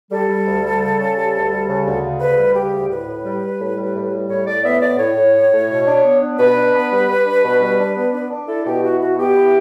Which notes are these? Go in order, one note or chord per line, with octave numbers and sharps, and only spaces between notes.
G3 A4
G3
D2
G3
C#3
C#3
G3
D2
G3
C#3
D2
C#3
D2 B4
G3
C#3 G4
D2
A2 B4
A2
G3
G3
A2
G3
A2
G3
A2 C#5
A2 D5
B3 E5
A2 D5
A2 C#5
A2
A2
A2
B2
D4
B3
D4
B2 B4
D4
B3
G3
G3
D4
B2
G3
D4
B3
D4
D4
E4 A4
B2 G4
E4 F#4
B2 F#4
B3 G4
E4